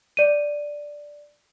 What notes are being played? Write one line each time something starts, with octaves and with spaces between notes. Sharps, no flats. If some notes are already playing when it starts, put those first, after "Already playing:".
D5 D#7